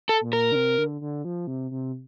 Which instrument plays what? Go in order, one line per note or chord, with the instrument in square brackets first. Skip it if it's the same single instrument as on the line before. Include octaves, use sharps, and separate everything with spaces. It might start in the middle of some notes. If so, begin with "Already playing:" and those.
[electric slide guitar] A4
[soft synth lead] A#2
[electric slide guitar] A#4
[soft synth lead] D3
C3
D3
D3
F3
C3
C3